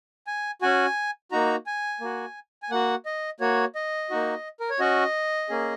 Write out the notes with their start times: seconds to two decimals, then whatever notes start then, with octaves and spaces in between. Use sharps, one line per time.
0.27 G#5
0.62 C#4 F#4 G#5
1.32 A#3 D#4 F#4 A#5
1.66 G#5
2.01 A#3 F#4
2.63 G#5
2.70 A#3 F#4 F#5
3.06 D#5
3.40 A#3 F#4 C#5
3.75 D#5
4.10 A#3 D#4 F#4
4.60 A#4
4.70 C#5
4.80 C#4 F#4 D#5
5.49 A#3 C#4 G#4